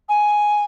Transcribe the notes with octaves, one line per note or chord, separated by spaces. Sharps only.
G#5